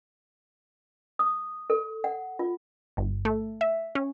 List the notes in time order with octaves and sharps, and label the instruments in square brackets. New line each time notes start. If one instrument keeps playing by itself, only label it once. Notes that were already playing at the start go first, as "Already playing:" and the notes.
[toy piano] D#6
A4
F#5
F4
[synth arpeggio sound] G1
A3
E5
C#4